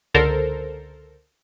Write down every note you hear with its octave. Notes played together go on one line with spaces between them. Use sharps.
C#2 D3 A4 A#4 C5